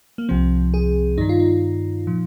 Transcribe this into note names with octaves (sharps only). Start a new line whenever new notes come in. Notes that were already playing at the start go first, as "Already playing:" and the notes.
A#3
C2 C3 F3 C4
G#4
G2 D#3 D#4
F4
D#4
A#2 F3